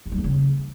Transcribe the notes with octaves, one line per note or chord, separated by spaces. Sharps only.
G2
F#3
E2
C#3